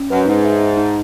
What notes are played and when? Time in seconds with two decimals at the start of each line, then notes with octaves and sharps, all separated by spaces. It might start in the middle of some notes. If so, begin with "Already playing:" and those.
Already playing: C#4
0.10 F#2 B4
0.26 G#2 D#4
0.44 E5
0.60 D#4
0.77 D#4